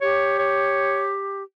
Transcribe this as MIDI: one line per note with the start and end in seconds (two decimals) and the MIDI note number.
0.01 1.43 67
0.01 0.36 73
0.39 1.12 73